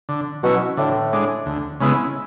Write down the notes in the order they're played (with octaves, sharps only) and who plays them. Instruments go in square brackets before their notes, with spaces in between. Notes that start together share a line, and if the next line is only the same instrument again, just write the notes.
[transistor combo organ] D3
[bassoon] B2 [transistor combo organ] F#3 C#4 E4
[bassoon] A2 [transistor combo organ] D3
[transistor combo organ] G#3 D4
D2
C#3 G#3 B3 E4